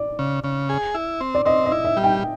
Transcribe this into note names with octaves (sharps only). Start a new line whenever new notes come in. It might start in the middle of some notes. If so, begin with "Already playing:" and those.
Already playing: D5
C#3
C#3
G#4
E4
C4
D5
C4 D#5
D#5
E4
E5
G3
G5